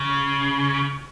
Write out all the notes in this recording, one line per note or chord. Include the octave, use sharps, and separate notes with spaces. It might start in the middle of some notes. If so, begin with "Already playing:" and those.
Already playing: C#3